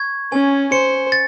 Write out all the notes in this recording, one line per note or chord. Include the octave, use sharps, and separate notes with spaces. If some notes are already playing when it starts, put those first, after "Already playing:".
Already playing: C#6 G#6
C#4 G#5
C5 C#7
A6